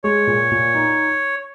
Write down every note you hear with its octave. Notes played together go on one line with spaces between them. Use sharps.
G#3 C#5
A#2
A#2
D#4